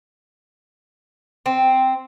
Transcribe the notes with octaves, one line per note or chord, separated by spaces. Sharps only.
C4